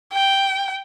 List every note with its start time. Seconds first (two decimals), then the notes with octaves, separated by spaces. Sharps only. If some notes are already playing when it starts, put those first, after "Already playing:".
0.13 G5